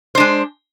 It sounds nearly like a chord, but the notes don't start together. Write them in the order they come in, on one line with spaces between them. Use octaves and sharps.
C5 D4 G#3